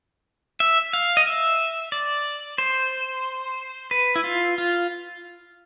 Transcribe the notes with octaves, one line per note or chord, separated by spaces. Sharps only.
E5
F5
D#5
E5
D5
C5
B4
E4
F4
F4